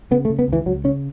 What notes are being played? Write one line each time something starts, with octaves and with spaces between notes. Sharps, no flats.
C#3 B3
A3
C#3
B3
C#2 E3
C#2 F#3
C#3 C#4